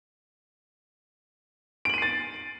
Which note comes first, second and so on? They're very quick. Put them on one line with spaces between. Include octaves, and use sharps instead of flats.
D7 F#7 D#7 C7 A6